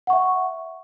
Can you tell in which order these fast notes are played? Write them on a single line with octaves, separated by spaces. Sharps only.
F#5 C#6 E5